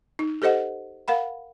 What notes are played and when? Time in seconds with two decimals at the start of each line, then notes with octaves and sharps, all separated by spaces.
0.19 D#4
0.42 G4 A4 C5 D#5 F#5
1.08 A#4 F5 F#5 B5